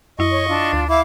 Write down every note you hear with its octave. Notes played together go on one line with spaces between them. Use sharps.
F#2 E4 D#5 C#6
C#5
D4 F4
D2
E4 E5 F5 D6